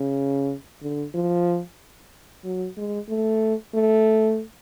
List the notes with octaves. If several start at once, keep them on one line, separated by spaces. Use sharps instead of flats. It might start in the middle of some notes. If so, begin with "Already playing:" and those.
Already playing: C#3
D3
F3
F#3
G#3
A3
A3